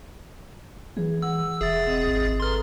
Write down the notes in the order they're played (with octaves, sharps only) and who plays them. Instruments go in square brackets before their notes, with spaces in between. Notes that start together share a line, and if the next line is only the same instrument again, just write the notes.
[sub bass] E3 [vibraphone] G#4
[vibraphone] F#5 [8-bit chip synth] E6
[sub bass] E1 [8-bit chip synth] G#4 A6 [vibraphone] E5
[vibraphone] C4 D#5
[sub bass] G#1
[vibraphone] A4 B4 A#5 [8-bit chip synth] C6 F6